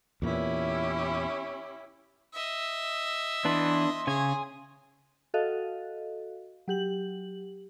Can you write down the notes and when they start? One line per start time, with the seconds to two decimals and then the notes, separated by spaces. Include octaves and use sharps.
0.22 E2 A#2 E3 C#4 E4 G4
2.33 D#5 E5
3.45 E3 B3 D4 B4 C6
4.07 C#3 G#4 C#5 G#5
5.34 F#4 A4 D#5 F5
6.68 F#3 G4 F#7